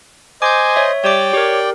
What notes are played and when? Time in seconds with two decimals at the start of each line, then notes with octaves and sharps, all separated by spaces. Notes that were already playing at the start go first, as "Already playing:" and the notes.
0.42 C5 D#5 G#5 D6 G6
0.76 C#5 E5
1.04 G3 C#5 D5 G5 D6
1.33 G4 A#4 C#5